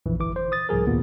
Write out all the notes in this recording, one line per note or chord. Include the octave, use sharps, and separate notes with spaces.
A#1 F2 E3
G1 E3 D6
C5
D#6 A6
C2 G#2 F3 G#4 A#4
D#2 A#2 B3